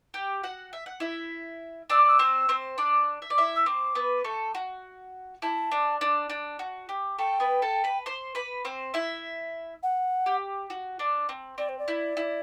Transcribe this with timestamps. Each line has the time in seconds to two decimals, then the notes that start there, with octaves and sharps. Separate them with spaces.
0.14 G4 G5
0.43 F#4 F#5
0.73 E5
0.86 F#5
1.00 E4 E5
1.90 D4 D5 E6
1.99 D6
2.07 E6
2.19 C4 C5
2.49 C4 C5
2.78 D4 D5
3.22 E5
3.30 D5
3.38 E4 E5
3.55 E6
3.66 C4 C5 D6
3.95 B3 B4
4.24 A3 A4
4.55 F#4
5.42 E4 A5
5.72 D4
6.01 D4
6.30 D4
6.59 F#4
6.89 G4
7.18 A3 A4 G5
7.40 B3 B4
7.62 A4 A5
7.84 B4 B5
8.06 C5 C6
8.35 B4 B5
8.65 C4 C5
8.94 E4 E5
9.83 F#5
10.26 G4
10.70 F#4
10.99 D4
11.29 C4
11.58 C4 D5
11.69 C5
11.78 D5
11.88 E4
12.17 E4